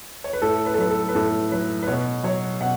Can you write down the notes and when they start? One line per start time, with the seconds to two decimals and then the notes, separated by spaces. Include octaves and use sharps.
0.24 C#5
0.33 B4
0.42 A2 A4
0.66 B4
0.74 A4
0.78 F#3 B4
0.90 A4
1.09 B4
1.15 A2 A4
1.51 F#3 B4
1.82 B4
1.87 B2 C#5
2.24 F#3 C#5
2.61 B2 F#5